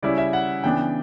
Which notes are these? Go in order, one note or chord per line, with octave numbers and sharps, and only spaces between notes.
C#3 G3 C#4 E4 D5
E5
F#5
C#3 E3 B3 D4 G5